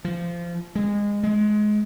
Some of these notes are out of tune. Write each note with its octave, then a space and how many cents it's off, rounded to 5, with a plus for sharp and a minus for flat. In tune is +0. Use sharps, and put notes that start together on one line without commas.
F3 -20
G#3 -20
G#3 +20